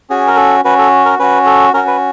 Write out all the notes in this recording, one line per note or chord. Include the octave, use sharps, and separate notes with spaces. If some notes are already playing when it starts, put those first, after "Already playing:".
C#4 F#4 G#4
A#4
A4
C#4 F#4 B4
A4
A#4
C#4 F#4 B4
A4
C#4 F#4 A#4
B4